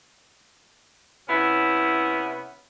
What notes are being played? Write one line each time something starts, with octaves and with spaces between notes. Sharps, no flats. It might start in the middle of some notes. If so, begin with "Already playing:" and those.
C3 B3 C#4 E4